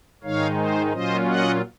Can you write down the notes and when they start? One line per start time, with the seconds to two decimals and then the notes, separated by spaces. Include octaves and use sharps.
0.23 G#2 D#3 G#3 D#4 C#5 F5
0.58 C5
0.92 A#2 F#3 C#4 F4 C5 D#5
1.27 D#5 F#5